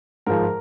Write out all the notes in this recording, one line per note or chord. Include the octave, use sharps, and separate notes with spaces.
G#2 F3 A#4